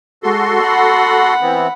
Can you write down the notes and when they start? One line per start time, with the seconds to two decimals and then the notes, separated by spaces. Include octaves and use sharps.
0.23 G#3 F#4 A4 C6
0.62 F#5 B5
1.41 E3 B3 C4